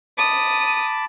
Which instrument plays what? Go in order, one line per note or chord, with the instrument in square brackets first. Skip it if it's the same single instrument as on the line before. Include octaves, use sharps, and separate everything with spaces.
[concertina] A5 B5 D6 [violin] D#6